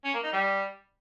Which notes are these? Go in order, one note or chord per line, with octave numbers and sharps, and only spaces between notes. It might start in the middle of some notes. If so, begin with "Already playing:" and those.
C#4
A#3
D#4
G3